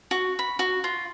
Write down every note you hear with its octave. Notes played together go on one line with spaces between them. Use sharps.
F#4
B5
F#4
F4